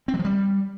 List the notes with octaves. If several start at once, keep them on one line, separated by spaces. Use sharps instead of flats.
C4
F#3
F3
G3